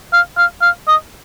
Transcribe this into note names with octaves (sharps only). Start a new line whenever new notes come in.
F5
F5
F5
D#5